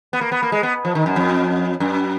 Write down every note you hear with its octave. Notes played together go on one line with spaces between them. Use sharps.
B3
A#3
B3
A#3
G#3
B3
F3
D#3
F#2
F2
F#2